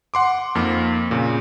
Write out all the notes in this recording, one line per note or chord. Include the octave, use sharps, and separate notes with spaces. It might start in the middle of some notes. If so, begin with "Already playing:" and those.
F#5 C6 D6
F2 A#3 D#4
A#2 C#3